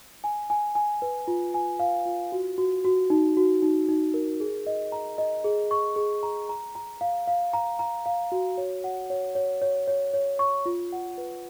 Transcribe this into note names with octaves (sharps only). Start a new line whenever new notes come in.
G#5
G#5
G#5
B4
F4
G#5
F5
F4
F#4
F#4
F#4
D#4
F#4
D#4
D#4
A#4
G#4
D#5
A#5
D#5
G#4
C#6
G#4
A#5
A#5
A#5
F5
F5
A#5
A#5
F5
F#4
C#5
F#5
C#5
C#5
C#5
C#5
C#5
C#6
F4
F#5
B4